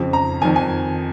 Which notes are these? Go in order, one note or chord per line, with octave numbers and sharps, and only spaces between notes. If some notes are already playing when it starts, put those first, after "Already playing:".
Already playing: F2 C#3
A#5
F2 D#3 G#5
G#5